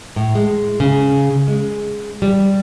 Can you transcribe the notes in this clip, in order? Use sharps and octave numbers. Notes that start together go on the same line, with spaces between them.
A2
G#3
C#3
G#3
G3